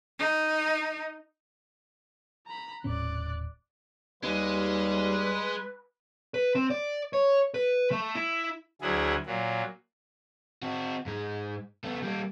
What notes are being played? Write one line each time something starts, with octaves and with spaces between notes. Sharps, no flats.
D#4
A#5 B5
D#1 A2 C#4 D5 F#6
D#2 G3 G#3 B4
B4
C4
D5
C#5
B4
A3
E4
D2 F#3 E4 G#4
A#2 F#3
C4 F#4
G#2 G#3
A3 B3
G3 A#3